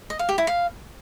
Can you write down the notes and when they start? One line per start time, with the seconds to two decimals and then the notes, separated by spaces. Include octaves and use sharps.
0.10 D#5
0.19 F5
0.29 G4
0.38 E4
0.47 F5